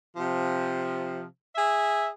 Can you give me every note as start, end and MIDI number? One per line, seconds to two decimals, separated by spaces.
0.16 1.24 48
0.16 1.24 53
1.55 2.08 68
1.55 2.08 76